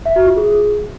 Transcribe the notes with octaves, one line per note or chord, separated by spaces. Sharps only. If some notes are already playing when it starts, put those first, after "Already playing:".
E5
F#4
F4
G#4